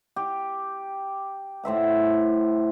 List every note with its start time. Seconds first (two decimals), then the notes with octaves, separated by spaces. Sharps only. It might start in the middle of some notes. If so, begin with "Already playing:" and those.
0.16 G4
1.63 A2 C5 E5 F#5